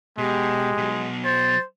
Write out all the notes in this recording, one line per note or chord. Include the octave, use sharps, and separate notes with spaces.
B2 G#3 G4
B2 F#3
C5 A6